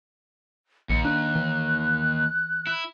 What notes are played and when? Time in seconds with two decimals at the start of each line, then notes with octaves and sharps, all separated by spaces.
0.90 A#1 D#2 C#7
1.05 D4 F#6
1.36 E3
2.67 E4